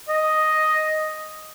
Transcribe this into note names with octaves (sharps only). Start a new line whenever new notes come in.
D#5